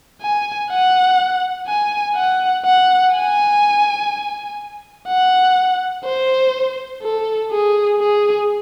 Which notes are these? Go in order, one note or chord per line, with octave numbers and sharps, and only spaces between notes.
G#5
F#5
G#5
F#5
F#5
G#5
F#5
C5
A4
G#4
G#4